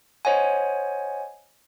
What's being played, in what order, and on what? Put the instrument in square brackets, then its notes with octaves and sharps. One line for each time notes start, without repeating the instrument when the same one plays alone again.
[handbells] C5 C#5 D#5 F#5 G#5